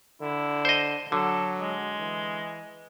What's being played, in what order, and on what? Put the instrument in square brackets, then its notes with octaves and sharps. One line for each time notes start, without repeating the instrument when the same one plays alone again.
[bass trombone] D3 [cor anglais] E4
[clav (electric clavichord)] C5 D#5
[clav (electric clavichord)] D3 [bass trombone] F#3 [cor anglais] A4
[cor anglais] G#3
[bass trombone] E3